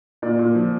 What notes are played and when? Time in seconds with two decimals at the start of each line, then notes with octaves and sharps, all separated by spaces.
0.22 A#2 D5
0.39 A#2
0.55 F3